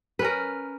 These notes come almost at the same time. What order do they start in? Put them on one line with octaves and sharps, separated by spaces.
B4 C#4 A#4